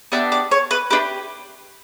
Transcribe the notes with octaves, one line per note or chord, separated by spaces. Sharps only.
B3 D4 G4 E5
D5
C#5
B4
D4 G4 B4